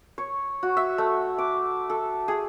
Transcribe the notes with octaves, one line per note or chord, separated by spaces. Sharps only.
C#5
F#4
E5
A3
D6
A4
G#4